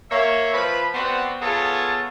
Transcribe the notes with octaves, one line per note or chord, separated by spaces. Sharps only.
A#3 C#5 E5
F3 B4 B5
B3 C4 F#4 C5 D5 F#5
B3 F4 G#4 A4 C#5 A5